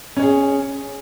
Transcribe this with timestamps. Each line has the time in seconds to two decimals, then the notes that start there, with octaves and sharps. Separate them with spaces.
0.16 C#4
0.20 C#5
0.23 G#4